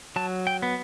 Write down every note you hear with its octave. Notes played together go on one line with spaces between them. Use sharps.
F#3 A5
G5
B3